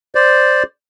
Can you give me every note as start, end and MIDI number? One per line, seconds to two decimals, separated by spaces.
0.15 0.63 72
0.15 0.63 74